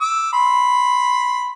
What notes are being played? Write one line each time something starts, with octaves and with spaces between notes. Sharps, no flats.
D6 E6
B5 C6